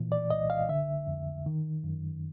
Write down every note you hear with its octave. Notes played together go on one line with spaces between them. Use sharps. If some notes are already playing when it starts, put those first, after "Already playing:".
Already playing: A#2 E3
D5
C2 D#5
F5
D3 E5
F2
D#3
F#2